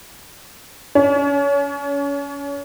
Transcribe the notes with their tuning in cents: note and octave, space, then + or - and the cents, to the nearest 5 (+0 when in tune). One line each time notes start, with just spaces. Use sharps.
C#4 +30